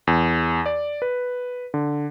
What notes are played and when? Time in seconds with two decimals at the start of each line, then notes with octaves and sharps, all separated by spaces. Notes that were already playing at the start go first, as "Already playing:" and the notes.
0.07 E2
0.66 D5
1.02 B4
1.74 D3